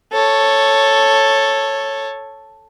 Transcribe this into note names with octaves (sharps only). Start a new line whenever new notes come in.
A4 C#5